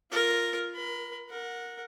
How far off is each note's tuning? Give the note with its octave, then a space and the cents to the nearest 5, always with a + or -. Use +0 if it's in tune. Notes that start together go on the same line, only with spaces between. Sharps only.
F4 +0 A#4 +0
A#4 +40 B5 +30
A#4 +0 F#5 -20